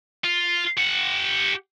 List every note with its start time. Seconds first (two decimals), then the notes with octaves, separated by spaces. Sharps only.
0.24 F4
0.77 G4 F#5